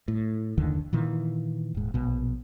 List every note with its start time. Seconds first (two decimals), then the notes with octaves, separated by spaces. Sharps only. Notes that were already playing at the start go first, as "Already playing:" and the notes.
0.08 A2
0.58 F#1 D#2 D3 D#3
0.93 A#2 D#3 E3
1.75 D#1 G#2
1.94 A#1 B2